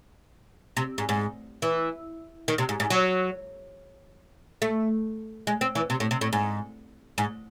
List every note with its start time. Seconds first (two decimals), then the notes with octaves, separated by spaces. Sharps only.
0.77 C3
0.98 G#2
1.09 G#2
1.62 E3
2.48 D#3
2.58 C3
2.69 G#2
2.80 G#2
2.90 F#3
4.62 A3
5.47 G#3
5.61 C4
5.75 E3
5.90 C3
6.00 A2
6.11 C3
6.21 A2
6.33 G#2
7.18 G#2